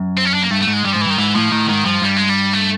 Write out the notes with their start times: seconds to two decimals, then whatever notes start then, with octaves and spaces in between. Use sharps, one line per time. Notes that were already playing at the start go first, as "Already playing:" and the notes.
Already playing: F#2
0.17 C4
0.25 C#4
0.34 D4
0.42 A#3
0.51 G2 A3
0.62 A3
0.67 G#2
0.73 G#3
0.84 G2 G3
0.93 G#2 F3
1.01 E3
1.07 G2 D#3
1.18 G#2 E3
1.35 A2 F3
1.52 A2 D#3
1.69 G#2 D#3
1.85 G2 F3
2.02 G2 G3
2.16 G#3
2.29 G3
2.53 A3